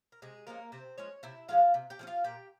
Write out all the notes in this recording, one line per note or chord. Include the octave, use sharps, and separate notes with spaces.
A#4
C3 G#3 G#4
F3 G#3 A#3 C#4 A#4
C3 C4 C5
F3 G#3 C#4 C#5
C3 E4 E5
F3 G#3 C#4 F4 F5
C3
G4 G5
F3 G#3 C#4
F4 F5
A#2 G4 G5